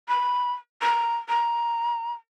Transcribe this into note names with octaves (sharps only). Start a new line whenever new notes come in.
B5
A#5
A#5